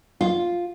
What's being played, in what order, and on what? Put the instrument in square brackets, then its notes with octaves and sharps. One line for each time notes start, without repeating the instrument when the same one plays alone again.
[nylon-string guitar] F4